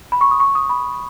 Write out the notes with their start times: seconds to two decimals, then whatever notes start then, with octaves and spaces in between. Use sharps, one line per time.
0.12 B5
0.21 C#6
0.31 D#6
0.40 C#6
0.55 D#6
0.70 B5